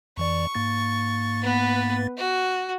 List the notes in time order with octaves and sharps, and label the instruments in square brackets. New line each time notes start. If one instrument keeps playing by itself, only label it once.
[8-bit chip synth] F2 E3 D5 [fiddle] C#6
[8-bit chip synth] G#2 A#3 A6
[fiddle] B3 B4
F#4